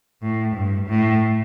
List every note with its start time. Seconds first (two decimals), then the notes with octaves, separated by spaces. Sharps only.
0.22 A2
0.55 G2
0.88 A2